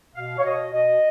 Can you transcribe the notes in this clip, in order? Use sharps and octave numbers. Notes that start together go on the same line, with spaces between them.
B2 F5
C#5
B2 D#5
B2 D#5